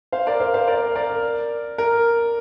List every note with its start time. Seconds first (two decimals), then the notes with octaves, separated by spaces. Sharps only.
0.12 C5 F5
0.27 A#4 D5
0.40 C5 F5
0.54 C5 F5
0.68 A#4 D5
0.95 A#4 D5
1.78 A#4